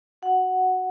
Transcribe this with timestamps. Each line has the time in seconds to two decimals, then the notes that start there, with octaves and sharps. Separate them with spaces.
0.22 F#4 F#5